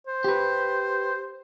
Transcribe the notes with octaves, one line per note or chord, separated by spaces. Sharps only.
C5
G4 B4